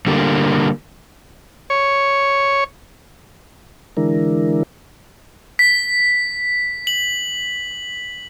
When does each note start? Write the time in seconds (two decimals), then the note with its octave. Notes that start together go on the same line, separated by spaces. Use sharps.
0.06 D3 G3 A#3
1.70 C#5
3.97 D3 E3 G#3 D4 E4 A#4
5.59 B6
6.87 F#7